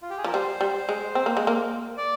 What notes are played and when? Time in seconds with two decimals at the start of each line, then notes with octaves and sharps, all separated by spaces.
0.02 F4
0.10 G4
0.18 G#4
0.24 F3 A#4
0.33 G3 C5
0.61 G3
0.89 G#3
1.15 C4
1.26 A#3
1.37 G#3
1.47 A#3
1.97 D5